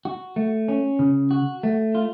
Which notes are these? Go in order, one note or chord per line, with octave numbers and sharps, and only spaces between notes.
F#4
A3
C#4
C#3
F#4
A3
F4